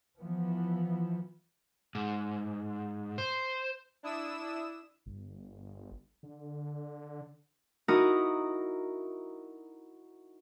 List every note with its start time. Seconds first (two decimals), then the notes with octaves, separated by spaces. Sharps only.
0.20 E3 F3 B3
1.95 G#2
3.18 C5
4.03 D4 E4 D#6 E6 E7
5.06 G1
6.23 D3
7.88 D#4 E4 F#4 A#4 D#6